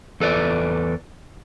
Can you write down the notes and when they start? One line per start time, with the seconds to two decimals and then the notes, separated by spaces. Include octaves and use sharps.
0.20 E2 A4 B4 D5